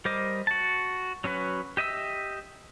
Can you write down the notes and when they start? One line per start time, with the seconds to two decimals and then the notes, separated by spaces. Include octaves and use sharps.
0.05 G3 A#4 C5 D#5 D6
0.47 F#4 A5
1.24 F#3 C#4 F#4 B4
1.77 G4 D#5 E5 E6